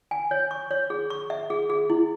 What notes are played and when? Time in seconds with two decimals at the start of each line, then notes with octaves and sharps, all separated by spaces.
0.11 G#5
0.31 C#5
0.51 C#6
0.71 C#5
0.90 G#4
1.10 C#6
1.30 E5
1.50 G#4
1.70 G#4
1.90 E4